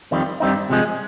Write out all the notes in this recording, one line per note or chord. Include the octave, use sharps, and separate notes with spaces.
F2 D#3 G3 C4
G2 G3 C4 D#4
C3 F3 G#3